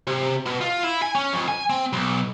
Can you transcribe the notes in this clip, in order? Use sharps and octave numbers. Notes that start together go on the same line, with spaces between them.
C3
B2
F4
E4
G#5
C#4
F2
G#5
C4
B1